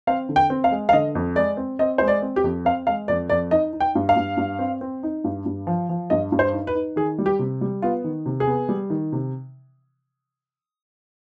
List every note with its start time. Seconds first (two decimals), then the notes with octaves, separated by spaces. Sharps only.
0.07 C4 F5
0.29 D3
0.36 G5
0.50 C4
0.64 F5
0.71 G#3
0.89 F5
0.93 D3 D#5
1.15 F2
1.36 G#3 D5
1.57 C4
1.79 C4 D#5
1.98 G#3 C5
2.08 D5
2.22 C4
2.36 G4
2.44 F2
2.65 C4 F5
2.87 G#3 F5
3.08 F2 D5
3.30 F2 D5
3.51 D#4 D#5
3.73 D#4
3.80 G5
3.95 G2
4.09 F5
4.16 G2
4.37 G2
4.59 C4
4.81 C4
5.03 D#4
5.24 G2
5.46 G2
5.67 F3
5.89 F3
6.10 G2 D#5
6.32 G2
6.39 C5
6.53 D#4
6.67 B4
6.75 D#4
6.96 D#3 G#4
7.18 G3
7.26 G4
7.39 C3
7.61 G3
7.82 B3 F4
8.04 D#3
8.26 C3
8.40 G#4
8.47 B3
8.69 G3
8.90 D#3
9.12 C3